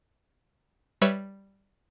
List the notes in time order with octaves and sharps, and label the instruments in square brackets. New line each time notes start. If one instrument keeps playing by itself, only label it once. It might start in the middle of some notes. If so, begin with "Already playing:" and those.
[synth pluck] G3 B4 C#5 E5